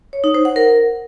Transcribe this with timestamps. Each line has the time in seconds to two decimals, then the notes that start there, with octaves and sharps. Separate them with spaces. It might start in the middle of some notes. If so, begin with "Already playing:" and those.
0.13 C#5
0.24 D#4
0.34 C5
0.45 F#5
0.56 A#4